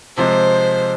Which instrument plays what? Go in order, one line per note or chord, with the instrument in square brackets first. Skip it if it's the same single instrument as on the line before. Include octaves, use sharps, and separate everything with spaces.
[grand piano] C3 F3 G#3 [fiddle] C5